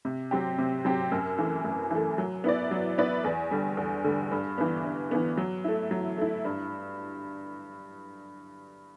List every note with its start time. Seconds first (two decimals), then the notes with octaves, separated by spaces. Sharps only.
0.05 C3
0.31 F#3 C4 G4
0.58 C3
0.85 F#3 C4 G4
1.12 F#2
1.38 E3 A3
1.65 F#2
1.91 E3 A3
2.18 F#3
2.44 B3 E4 B4 D5
2.71 F#3
2.98 B3 E4 B4 D5
3.24 E2
3.51 D3 G3
3.77 E2
4.04 D3 G3
4.31 G2
4.58 E3 B3
4.84 G2
5.11 E3 B3
5.37 F#3
5.64 A3 E4
5.91 F#3
6.18 A3 E4
6.45 G2